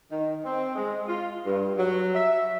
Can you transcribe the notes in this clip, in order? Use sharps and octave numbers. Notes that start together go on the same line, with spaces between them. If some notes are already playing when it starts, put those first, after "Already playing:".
D#3
C4
G#3
F4
G2
F#3
E5